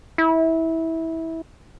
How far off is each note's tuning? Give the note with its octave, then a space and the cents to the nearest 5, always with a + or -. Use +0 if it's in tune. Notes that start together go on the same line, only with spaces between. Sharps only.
E4 -20